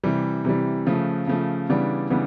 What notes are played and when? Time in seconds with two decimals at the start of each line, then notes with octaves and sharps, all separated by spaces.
0.04 C3 E3 G3
0.45 C3 E3 G3
0.87 C#3 F3 A3
1.27 C#3 F3 A3
1.70 C#3 E3 G3 B3 D4
2.10 C#3 E3 G3 B3 D4